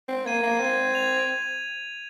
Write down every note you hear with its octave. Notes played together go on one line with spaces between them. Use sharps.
C4
A#3 G#6 D#7
A#3
C4 G#6 D#7
G#6 F7